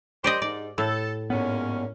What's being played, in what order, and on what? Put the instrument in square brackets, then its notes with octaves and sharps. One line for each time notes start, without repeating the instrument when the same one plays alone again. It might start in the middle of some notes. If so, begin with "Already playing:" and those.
[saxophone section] G3 C5 [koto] G4 D5 D#5
[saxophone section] G#2 [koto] D5
[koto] A2 [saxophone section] A4
[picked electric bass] G#2 B3 [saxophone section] G#3 A#3 C#4